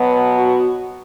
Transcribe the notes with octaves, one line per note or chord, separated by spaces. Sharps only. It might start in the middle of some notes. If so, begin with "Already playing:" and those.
Already playing: B2 F#3 B3
F#4